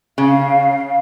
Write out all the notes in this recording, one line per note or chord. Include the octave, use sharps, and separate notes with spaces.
C#3 F5